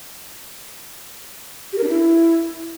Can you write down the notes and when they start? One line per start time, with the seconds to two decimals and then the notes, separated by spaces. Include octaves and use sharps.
1.73 G4
1.78 A#4
1.84 D4
1.89 E4